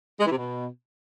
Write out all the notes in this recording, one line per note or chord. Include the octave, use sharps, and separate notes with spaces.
G#3
E3
C3
B2